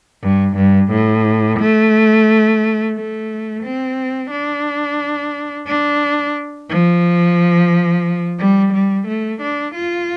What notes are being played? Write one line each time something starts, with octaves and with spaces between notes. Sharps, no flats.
G2
G2
A2
A3
A3
C4
D4
D4
F3
G3
G3
A3
D4
F4